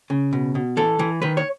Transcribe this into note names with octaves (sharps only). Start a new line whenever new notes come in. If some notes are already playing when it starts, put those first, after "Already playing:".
C#3
B2
B2
E3 A4
E3
D#3 B4
C#5